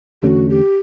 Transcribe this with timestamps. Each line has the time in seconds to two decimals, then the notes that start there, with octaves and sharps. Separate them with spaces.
0.22 E2 D3 A3 C#4 F#4 G4
0.49 G4